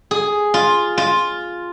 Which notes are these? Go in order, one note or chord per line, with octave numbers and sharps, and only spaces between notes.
G#4
F4
F4